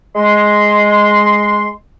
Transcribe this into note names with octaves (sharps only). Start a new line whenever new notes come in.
G#3 C6